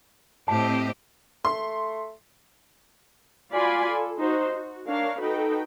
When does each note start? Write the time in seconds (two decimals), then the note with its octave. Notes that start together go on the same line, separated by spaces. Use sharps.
0.48 A2 C4 G4 C5 D#5 A5
1.45 A3 C6
3.51 F4 F#4 D5 G#5 B5 C6
3.89 A4
4.19 D#4 F#4 C5
4.52 F#4
4.87 D4 A#4 C#5 F5
5.20 D#4 F#4 A4 B4 G5